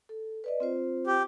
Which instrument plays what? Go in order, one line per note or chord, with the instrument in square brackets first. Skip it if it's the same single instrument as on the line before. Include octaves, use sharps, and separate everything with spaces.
[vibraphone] A4
B4 D5 D#5
C4 F4 C5
[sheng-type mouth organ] G4